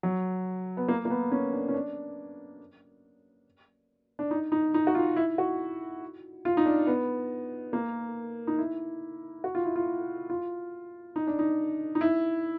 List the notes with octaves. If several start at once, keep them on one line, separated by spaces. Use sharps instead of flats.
F#3
B3
A#3
A#3
B3
C#4
D4
C#4
D4
D4
D#4
D#4
D#4
F#4
F4
E4
F#4
F4
D#4
D4
B3
A#3
D#4
E4
F#4
F4
E4
F4
F4
D#4
D4
D#4
D#4
E4